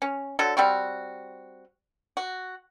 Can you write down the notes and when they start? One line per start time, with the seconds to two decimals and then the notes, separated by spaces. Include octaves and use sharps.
0.02 C#4
0.39 D3 F#3 A4
0.57 G3 C4 F#4
2.17 F#4